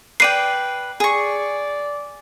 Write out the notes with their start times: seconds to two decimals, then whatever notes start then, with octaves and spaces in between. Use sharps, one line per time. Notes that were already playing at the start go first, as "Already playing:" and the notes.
0.20 B4 D5 G5 C7 D#7
1.00 G#4 D5 C#6